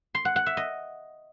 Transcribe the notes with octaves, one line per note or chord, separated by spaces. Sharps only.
C6
F#5
F#5
E5
D#5